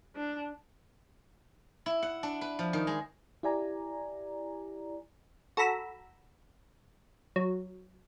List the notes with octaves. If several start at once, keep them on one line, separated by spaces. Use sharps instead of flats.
D4
E4
F#5
D4
B4
F3
D#3
G#3
E4 G4 D5 G#5 A#5
F#4 A4 A#5 B5 E6
F#3